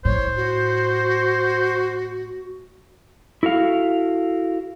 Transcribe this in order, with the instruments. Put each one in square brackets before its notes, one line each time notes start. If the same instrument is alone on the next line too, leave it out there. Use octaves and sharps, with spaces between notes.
[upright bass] A2 [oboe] C5 [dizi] C#5
[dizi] F#4
[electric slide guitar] E4 F#4 A4 F5